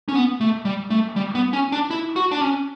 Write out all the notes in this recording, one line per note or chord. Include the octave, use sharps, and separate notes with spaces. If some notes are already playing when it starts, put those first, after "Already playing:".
C#4
B3
A3
G3
A3
G3
B3
C#4
D4
E4
F#4
D4
C#4